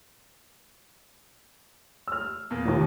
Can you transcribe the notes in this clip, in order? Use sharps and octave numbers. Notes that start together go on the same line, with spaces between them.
E6 F6
E2 A#2 A#3
A#1 D#2